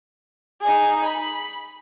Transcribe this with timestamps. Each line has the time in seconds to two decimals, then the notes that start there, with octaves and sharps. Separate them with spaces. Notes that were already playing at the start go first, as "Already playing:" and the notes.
0.61 D#4 G#4
1.05 B5